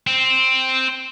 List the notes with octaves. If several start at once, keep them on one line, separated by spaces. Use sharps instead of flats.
C4